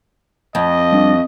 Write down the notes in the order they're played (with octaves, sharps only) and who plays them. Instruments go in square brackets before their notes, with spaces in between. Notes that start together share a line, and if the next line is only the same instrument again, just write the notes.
[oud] F2 [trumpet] D#5
[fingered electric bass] G3 D4